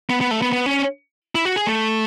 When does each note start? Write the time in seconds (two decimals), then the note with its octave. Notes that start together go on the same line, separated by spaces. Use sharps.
0.10 B3
0.21 B3
0.31 A3
0.42 B3
0.52 B3
0.66 C#4
1.35 E4
1.45 F#4
1.56 G#4
1.67 A3